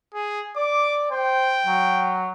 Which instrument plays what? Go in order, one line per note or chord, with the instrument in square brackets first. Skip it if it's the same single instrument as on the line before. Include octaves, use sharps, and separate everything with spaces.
[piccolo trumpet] G#4
[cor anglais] D5 [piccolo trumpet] D6
[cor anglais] C5 [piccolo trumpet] G5
[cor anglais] F#3